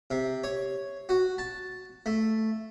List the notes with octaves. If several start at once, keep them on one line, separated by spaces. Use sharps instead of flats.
C3
C#5
F#4
A5
A3